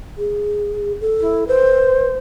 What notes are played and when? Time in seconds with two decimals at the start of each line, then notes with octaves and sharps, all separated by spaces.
0.18 G#4
1.01 A4
1.21 E4
1.47 B4 C5